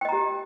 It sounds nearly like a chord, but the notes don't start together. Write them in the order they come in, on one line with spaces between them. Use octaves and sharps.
G5 D#5 A#5 G4